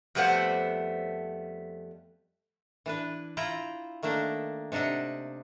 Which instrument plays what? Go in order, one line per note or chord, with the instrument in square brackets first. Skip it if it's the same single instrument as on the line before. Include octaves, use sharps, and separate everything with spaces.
[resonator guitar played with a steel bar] F2 G3 A3 B3 C5 F#5
[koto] E3 D4 B4
E4 F4 G5 A#5
D#3 A3 A#3 D4
C3 D4 D#4 E5 F#5